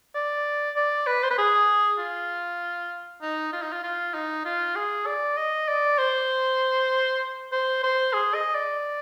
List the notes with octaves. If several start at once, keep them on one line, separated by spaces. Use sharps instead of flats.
D5
D5
B4
C5
B4
G#4
F4
D#4
F4
D#4
F4
F4
D#4
F4
G#4
D5
D#5
D5
C5
C5
C5
G#4
D#5
D5